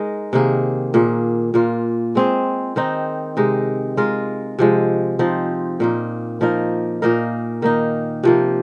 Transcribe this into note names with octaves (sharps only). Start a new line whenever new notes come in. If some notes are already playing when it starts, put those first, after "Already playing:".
Already playing: G#3 D#4 A#4
C3 D#3 A#3 G#4
A#2 A#3 G#4
A#2 A#3 F4
G#3 C4 G#4
D#3 C4 D#4
C3 G#3 D#4
G#3 F4 A#4
C3 F3 G#3
F3 C4 D#4
A#2 A#3 D#4
F3 A#3 D#4 A#4
A#2 A#3 D#4 A#4
D#3 A#3 D#4
C3 F3 A#3